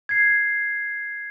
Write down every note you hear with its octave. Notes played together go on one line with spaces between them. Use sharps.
G#6 C7